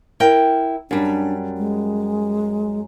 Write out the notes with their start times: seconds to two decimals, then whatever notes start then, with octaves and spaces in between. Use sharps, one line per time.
0.20 E4 A#4 G5
0.91 F#2 G3 D4
1.58 G#3